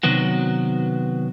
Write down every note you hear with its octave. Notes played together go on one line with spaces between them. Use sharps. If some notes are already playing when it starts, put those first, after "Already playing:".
C3 D#3 F#3 B3 F#4